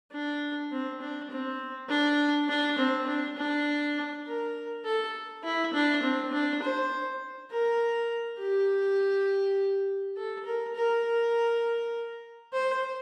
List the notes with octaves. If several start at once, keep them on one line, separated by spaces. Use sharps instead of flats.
D4
C4
D4
C4
D4
D4
C4
D4
D4
A#4
A4
E4
D4
C4
D4
C5
A#4
G4
A4
A#4
A#4
C5